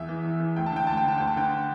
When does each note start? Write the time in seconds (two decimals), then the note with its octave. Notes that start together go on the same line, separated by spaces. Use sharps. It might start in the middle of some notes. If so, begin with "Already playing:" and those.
Already playing: E2 E5
0.09 E3
0.25 E2
0.40 E3
0.56 D2 G5
0.66 A5
0.72 D3 G5
0.87 D2 A5
0.97 G5
1.04 D3 A5
1.18 D2 G5
1.27 A5
1.36 D3 G5